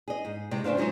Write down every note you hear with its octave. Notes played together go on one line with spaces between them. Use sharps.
G#4 D#5
G#2
A2 C3 G#3
C#3 A3 D4 C5 F5
F3 F#3 G#3 D#4 C5